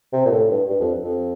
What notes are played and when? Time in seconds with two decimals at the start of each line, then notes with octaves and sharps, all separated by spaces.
0.13 C3
0.25 A#2
0.31 A2
0.50 G2
0.69 G2
0.80 F2
1.03 F2